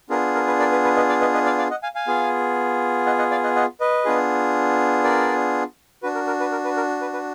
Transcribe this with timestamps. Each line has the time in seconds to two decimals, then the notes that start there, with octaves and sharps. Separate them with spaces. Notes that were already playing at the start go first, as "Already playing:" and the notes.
0.10 B3 D4 F4 G#4 A#4
0.35 A#4
0.47 B4
0.59 A#4 D5
0.72 B4
0.84 B4
0.96 B4 D#5
1.09 D5 F5
1.21 B4 D#5
1.34 B4 D#5
1.46 D5 F5
1.58 D5 F5
1.70 D#5 F#5
1.83 F5 G#5
1.95 F5 G#5
2.07 B3 F4 G#4
3.06 D#5 F#5
3.19 D#5 F#5
3.31 D5 F5
3.44 D#5 F#5
3.56 D#5 F#5
3.80 B4 D#5
4.05 B3 D4 F4 G#4
5.04 A#4 D5
6.03 D4 F#4 B4
6.15 A#4
6.27 A#4
6.40 B4
6.52 A#4
6.64 B4
6.77 A#4
7.01 B4
7.13 B4